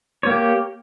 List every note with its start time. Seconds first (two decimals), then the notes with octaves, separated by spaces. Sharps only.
0.23 C#5
0.27 A#3
0.30 G4